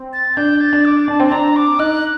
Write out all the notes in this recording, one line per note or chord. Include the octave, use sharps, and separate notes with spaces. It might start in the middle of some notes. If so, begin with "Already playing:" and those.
Already playing: C4
A6
D4 G6
A6
D4
D6
D4 A5
C4
A5
D4 A#5
D6
D#4 F#6